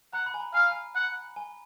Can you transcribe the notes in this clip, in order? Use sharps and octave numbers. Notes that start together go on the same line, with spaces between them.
F#5 A#5
B5
G#5
A#5
F5 G#5
G#5
F#5
G#5